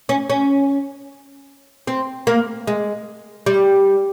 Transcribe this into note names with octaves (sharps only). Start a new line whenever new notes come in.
C#4
C#4
C4
A#3
G#3
G3